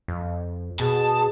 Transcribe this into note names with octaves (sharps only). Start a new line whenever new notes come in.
F2
B2 G#4 A5